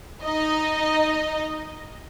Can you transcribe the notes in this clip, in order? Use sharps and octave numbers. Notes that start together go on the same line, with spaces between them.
D#4 D#5